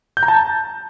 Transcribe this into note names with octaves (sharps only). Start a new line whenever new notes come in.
G6
A#5
A5